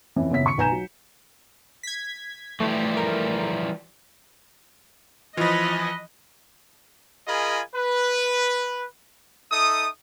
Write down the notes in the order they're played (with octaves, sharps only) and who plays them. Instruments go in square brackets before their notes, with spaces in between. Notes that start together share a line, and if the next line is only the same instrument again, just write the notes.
[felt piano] F2 E3 C#4
F#1 B3 C#5 E5 B6
D#1 C#6 C#7
B1 B4 G#5 A#5 G6 E7
F#3
[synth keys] G#6 B6
[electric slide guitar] E3 F3 G3 [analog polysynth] A3
[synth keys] A#4
[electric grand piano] E3 F3 [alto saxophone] F4 [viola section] D#5 [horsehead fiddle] F#5 B5
[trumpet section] F4 G#4 A#4 D#5 G#5 B5
B4
D#4 A4 E5 D#6